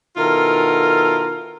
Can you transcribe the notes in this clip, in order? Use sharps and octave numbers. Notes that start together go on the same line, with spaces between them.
B2 D#3 E4 F4 A4 A#4